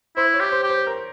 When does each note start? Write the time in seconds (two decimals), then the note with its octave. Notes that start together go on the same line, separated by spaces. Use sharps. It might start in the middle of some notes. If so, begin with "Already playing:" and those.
0.17 E4 C5
0.34 C#5
0.40 G4
0.52 C5
0.63 G4
0.69 C5
0.87 A#4